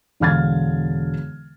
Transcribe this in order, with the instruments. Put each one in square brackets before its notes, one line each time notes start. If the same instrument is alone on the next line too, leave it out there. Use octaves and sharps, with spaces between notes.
[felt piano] E1 D3 F5 F6 G#6 A6